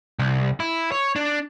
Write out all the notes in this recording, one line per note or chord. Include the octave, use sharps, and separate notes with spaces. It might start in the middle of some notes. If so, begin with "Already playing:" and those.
C2
E4
C#5
D4